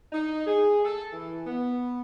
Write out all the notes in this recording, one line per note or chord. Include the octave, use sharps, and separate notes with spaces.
D#4
G#4
A4
E3
B3